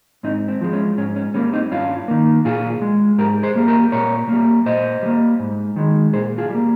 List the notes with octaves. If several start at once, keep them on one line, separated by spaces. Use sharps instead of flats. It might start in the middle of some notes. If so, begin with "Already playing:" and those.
G#2 C4 D#4
C4
F3 G#3
C#4
G#2 C#4
C#4
G3 A#3 C#4
C4 D#4
G2 C#4 F4
D#3 A#3
A#2 F4 G#4
G#3
G#2 G4 A#4
G#4 C5
G3 A#3
G4 A#4
A#2 A#4 C#5
G3 A#3
A#2 C5 D#5
G3 A#3
G#2
D#3 G#3
A#2 G#4 C5
F4 G#4
G3 A#3